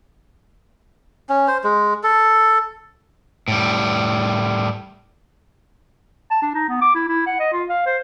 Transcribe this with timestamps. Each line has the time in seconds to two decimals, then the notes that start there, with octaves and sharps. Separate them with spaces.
1.29 C#4
1.48 C5
1.64 G#3
2.03 A4
3.48 A2 G3
6.31 A5
6.42 D4
6.54 D#4
6.69 B3
6.81 D6
6.95 E4
7.09 E4
7.26 F#5
7.40 D#5
7.53 F4
7.69 F5
7.86 C5